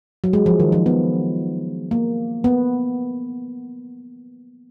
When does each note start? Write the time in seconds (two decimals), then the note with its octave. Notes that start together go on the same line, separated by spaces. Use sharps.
0.24 F#3
0.33 G#3
0.46 F3
0.60 D#3
0.72 F3
0.86 B3
1.91 A#3
2.44 B3